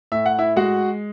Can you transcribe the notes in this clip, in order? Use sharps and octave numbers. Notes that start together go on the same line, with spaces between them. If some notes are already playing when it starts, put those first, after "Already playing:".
A2 E5
F#5
E4 E5
G#3 F#4 F#5